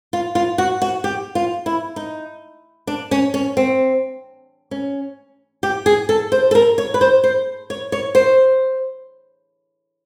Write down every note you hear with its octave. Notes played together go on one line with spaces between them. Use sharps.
F4
F4
F#4
F#4
G4
F4
E4
D#4
D4
C#4
C#4
C4
C#4
G4
G#4
A4
C5
A4
A#4
C#5
B4
C5
C5
C#5
C#5
C5